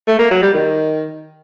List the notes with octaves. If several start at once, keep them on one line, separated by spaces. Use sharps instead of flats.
A3
A#3
F#3
G3
D#3